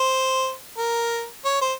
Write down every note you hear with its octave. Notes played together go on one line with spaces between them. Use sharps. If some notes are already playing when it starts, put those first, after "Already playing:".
Already playing: C5
A#4
C#5
C5